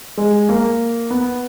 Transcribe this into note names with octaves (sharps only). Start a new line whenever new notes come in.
G#3
A#3
B3